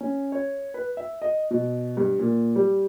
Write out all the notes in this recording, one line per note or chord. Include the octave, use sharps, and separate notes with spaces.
C#4
C#5
B4
E5
D#5
B2
G2
A#2
G3